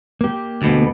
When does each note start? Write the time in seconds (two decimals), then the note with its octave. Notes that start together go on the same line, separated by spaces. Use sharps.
0.21 A#3 G4
0.62 D2 B2